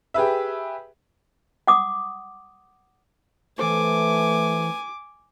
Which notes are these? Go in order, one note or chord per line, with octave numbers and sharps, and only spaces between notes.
G4 G#4 B4 E5
F#5 D6 D#6
E3 A3 A4 B4 C5 G#5 D6